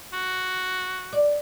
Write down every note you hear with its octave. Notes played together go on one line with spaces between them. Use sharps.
F#4
D5